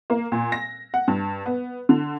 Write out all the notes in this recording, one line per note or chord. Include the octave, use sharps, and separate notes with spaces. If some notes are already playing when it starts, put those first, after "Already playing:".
A#3
A#2
A#6
F#5
G2
B3
D3